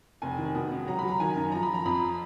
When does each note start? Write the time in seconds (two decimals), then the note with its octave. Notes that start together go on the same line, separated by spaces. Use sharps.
0.22 F1 G#5
0.38 D#3
0.55 B2
0.72 C#2
0.87 F#3 A#5
0.99 F#3 B5
1.09 A#5
1.20 D#3 G#5
1.36 F#2
1.52 F3 A#5
1.63 B5
1.68 F3
1.74 A#5
1.85 F2 B5